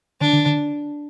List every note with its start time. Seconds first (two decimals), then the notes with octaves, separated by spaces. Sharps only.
0.21 D3 D4
0.33 D3
0.46 D3